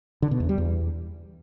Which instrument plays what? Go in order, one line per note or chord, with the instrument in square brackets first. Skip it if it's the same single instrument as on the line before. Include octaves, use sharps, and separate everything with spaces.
[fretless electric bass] D3
B2
E2
G3
E2